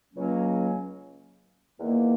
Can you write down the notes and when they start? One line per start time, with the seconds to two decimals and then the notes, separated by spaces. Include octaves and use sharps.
0.13 C#2 C#3 F#3 A#3 C#4
1.80 E2 D#3 A#3